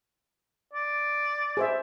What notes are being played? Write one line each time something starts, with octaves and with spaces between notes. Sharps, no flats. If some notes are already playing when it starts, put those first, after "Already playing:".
D5
G#4 C5 E5